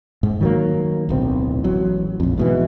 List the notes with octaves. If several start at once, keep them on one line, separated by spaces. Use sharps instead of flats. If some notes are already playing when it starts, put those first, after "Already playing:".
G#2
D#3 F#3 A#3
D1 B1 C4
A1 F#3
A#1 F2
G#2 B2 E3